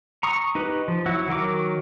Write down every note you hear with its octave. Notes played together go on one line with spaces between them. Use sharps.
A#5 C#6 D#6
D#4 G4 B4
F3
F#3 E4 F#4
D#3 F#3 A#4 D6